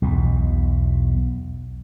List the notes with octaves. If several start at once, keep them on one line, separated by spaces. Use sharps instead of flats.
B1 E2 B2